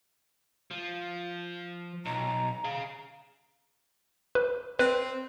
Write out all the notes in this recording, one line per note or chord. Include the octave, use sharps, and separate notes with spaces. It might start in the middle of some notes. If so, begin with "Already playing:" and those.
F3
B1 A#5
G#4 F5
B4
C4 B4